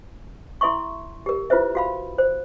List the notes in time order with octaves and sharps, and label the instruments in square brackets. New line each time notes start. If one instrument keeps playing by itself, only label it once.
[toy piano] E4 A4 E5 C6 C#6
G4 A#4
E4 F4 B4 C5 E5
F#4 F5 B5
C5